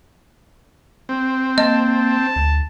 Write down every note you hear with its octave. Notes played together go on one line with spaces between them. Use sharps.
C4
A#3 D#5 A5
A5
D2